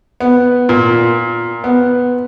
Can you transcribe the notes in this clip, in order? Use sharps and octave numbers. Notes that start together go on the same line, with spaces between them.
B3
A#2
B3